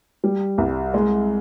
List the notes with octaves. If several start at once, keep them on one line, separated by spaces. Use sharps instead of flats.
G3
C2
G#3